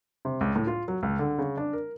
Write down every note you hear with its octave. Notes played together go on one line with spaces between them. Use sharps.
C3
C#2
A2
F4
F#3
C#2
D3
C#3
D4
A#4